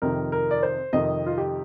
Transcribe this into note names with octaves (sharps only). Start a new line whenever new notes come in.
F2 C3 D#3 A#4
A#4
D5
C5
F2 C3 D#3 D#5
F4
G4